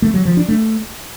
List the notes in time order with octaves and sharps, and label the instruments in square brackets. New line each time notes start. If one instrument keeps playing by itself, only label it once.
[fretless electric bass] A3
F#3
F3
D4
A3